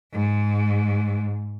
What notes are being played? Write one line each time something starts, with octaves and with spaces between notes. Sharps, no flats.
G#2